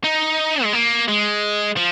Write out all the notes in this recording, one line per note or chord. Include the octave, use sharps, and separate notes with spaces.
D#4
G#3
A#3
G#3
F3